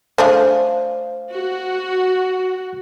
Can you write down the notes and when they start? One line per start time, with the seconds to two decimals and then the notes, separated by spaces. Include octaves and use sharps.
0.18 A3 D4 G#4 C5 F5
1.30 F#4